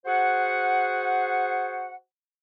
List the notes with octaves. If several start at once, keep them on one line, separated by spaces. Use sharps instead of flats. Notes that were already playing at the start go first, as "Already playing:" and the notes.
F#4 G#4 C5 F#5